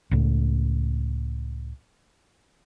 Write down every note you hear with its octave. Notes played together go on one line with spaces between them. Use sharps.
C#2 A2